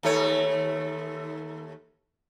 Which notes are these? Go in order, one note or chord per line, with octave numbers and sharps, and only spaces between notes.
D#2 A3 C#5